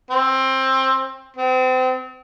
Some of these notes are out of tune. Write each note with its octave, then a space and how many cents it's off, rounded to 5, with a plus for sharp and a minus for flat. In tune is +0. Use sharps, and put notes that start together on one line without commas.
C4 +20
C4 -35